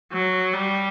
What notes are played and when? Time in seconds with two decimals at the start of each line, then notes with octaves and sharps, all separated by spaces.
0.13 F#3
0.53 G3